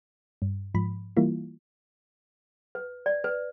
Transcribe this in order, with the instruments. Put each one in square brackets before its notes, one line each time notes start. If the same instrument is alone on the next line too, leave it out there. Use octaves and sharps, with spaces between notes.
[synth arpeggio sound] G2
G#2 F3 B5
E3 G3 A#3 E4 F4
[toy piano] B4
D5
B4